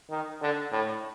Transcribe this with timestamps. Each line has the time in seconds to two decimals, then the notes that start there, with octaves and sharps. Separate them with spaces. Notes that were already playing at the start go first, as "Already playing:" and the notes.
0.10 D#3
0.42 D3
0.72 A2